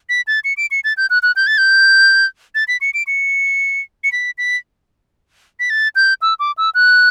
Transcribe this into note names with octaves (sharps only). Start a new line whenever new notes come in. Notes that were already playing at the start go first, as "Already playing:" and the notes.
B6
A6
C#7
D7
C#7
A6
G6
F#6
F#6
G6
A6
G6
A6
B6
C#7
D7
C#7
C#7
B6
B6
B6
A6
G6
E6
D6
E6
F#6